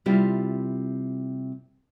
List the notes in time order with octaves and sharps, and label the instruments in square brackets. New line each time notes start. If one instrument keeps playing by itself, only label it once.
[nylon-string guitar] C3 G3 E4 F4